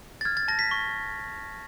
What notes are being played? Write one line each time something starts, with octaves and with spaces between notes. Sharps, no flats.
A6
F6 G#6
A6
A5 A#6
B6
C#6